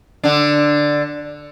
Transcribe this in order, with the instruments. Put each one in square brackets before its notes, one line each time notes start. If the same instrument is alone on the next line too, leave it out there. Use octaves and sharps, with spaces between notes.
[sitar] D3 D4